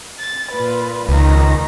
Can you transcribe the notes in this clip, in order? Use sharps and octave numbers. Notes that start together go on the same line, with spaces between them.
A6
A#2 F4 B4
C#2 D#3 A#5